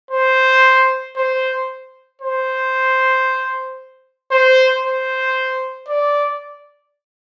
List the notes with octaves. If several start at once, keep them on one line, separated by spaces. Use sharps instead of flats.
C5
C5
C5
C5
C5
D5